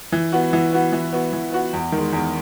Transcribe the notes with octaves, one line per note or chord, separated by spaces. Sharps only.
E3
B3 F#4
E3
B3 F#4
E3
B3 F#4
E3
B3 F#4
E2
D#3
G#3
E2